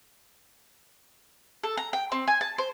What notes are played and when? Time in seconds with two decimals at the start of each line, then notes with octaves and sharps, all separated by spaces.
1.63 A4
1.77 A#5
1.93 G5
2.12 C4
2.27 G#5
2.41 A5
2.58 C5